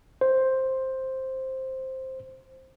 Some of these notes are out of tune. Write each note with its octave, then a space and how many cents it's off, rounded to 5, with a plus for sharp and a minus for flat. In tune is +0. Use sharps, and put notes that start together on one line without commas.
C5 +5